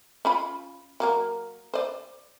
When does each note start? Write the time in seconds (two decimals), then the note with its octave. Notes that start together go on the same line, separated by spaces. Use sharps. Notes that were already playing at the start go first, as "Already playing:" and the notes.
0.25 C#4 F4 B5
1.00 F#3 A#3 A#4
1.74 C5 D5